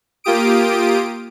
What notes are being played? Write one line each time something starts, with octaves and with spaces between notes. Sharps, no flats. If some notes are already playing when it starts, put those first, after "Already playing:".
A#3 F4 G4 D#6 D7